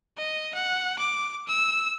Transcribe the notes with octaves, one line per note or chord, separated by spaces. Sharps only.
D#5
F#5
D6
E6